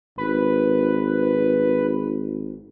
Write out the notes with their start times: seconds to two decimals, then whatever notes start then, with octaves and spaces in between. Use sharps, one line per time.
0.18 G#1 B4